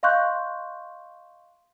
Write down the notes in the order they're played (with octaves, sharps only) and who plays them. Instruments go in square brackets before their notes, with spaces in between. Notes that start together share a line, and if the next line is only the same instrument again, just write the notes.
[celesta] D#5 F5 C6 C#6 F#6 G6